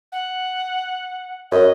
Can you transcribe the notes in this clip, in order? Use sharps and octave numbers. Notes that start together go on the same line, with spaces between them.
F#5
F#2 D#5